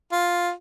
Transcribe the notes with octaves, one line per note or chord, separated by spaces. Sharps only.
F4